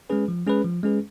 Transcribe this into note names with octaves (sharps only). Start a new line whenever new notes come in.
G#3 C#4 G#4 B4
F3
G#3 C#4 G#4 B4
F3
G#3 C#4 G#4 B4